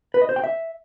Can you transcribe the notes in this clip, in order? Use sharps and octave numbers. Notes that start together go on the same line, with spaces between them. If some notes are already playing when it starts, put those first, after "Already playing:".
B4
D#5
C5
G5
E5